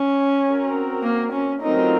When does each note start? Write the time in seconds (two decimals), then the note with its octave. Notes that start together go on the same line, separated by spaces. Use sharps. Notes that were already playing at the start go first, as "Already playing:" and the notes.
Already playing: C#4
0.45 C4 F#4 A#4
1.03 A#3
1.32 C#4
1.62 F#3 A3 C4 D#4 F4 A#4